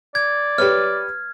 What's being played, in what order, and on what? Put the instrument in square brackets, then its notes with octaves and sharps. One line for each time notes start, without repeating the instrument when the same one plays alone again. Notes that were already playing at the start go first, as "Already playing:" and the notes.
[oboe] D5 [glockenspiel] G#6
[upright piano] G4 B4 C#5 [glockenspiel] F6